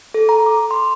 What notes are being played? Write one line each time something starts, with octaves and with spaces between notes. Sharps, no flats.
A4
A#5
D6
C6